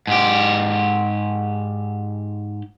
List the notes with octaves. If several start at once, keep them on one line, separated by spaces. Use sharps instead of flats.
G#2 G4